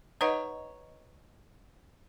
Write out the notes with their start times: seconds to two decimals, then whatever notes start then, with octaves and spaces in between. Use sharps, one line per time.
0.21 D#4 B4 C#5 D#5 F#5